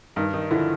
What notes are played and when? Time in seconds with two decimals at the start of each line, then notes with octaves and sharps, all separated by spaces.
0.16 G2 D#3 D#4
0.33 D#3 D#4
0.51 D3 E3 F3 E4